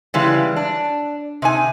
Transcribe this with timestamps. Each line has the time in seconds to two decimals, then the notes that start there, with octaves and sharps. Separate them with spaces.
0.14 C#3 E3 G3 G#3
0.56 D4
1.42 C3 D#4 G#5